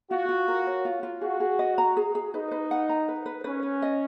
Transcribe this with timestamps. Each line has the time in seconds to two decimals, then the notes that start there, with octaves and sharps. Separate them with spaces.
0.10 F4 F#4
0.29 F4
0.48 A#4
0.67 C#5
0.85 F4
1.03 F4
1.21 F#4 G#4
1.40 G#4
1.59 D#5
1.78 A#5
1.97 G#4
2.15 G#4
2.34 D#4 B4
2.51 B4
2.71 F#5
2.89 A#5
3.08 B4
3.26 B4
3.44 C#4 B4
3.63 B4
3.82 D#5